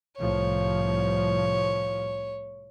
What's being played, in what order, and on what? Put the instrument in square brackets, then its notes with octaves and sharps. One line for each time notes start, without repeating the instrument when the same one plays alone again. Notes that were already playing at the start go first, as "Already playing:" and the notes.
[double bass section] C2 A2 F3 [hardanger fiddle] C#5